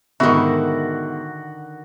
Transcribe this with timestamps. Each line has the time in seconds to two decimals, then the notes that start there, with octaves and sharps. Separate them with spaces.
0.20 G#2 B2 D3 D#3 E4 F#4